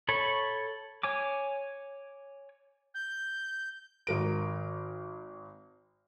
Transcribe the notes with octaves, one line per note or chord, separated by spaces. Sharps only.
A4 C#5 B5 C#6
C#5 G#5 D6
G6
G#1 A#4 D7